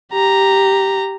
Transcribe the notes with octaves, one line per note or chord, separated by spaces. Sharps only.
G4 A#5